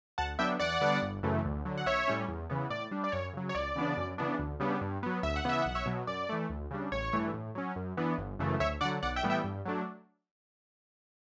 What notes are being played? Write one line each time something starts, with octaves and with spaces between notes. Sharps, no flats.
D2 F#5 A5
D3 F#3 B3 D4 E5 G5
E2 D5 F#5
D3 G3 B3 D4
G1
F#2 C#3 E3 A3
D2
D3 F#3
F#5
B1 C#5 E5
A2 G3 C#4
E2
C#3 E3 B3
A2 D5
G3 D4
D5
F#2 C#5
C#3 F#3
C#5
C#2 D5
C#3 E3 B3 D4
F#2
C#3 E3 B3 D4
D2
C#3 G3 B3 D4
G2
F#3 B3
D2 E5
F#5
C#3 E3 B3 E5
B1 F#5
C#5 E5
B2 F#3
F#2 D5
E3 A3
D2
C#3 G3 D4
A1 C#5
G2 E3 A3
A2
F#3 C#4
F#2
E3 B3 D4
G1
F#2 C#3 E3 A3
D2 C#5 E5
D3 F#3 D5 F#5
B1 D5 F#5
E5 G5
A2 E3 G3 B3
E5 G5
G2
F#3 A3 D4